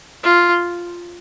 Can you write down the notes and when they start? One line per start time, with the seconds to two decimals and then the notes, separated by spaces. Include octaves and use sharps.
0.23 F4